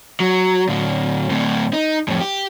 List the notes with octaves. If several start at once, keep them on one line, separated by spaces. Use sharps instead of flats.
F#3
A2 D3
D2 A2
D#4
F2 A2
G4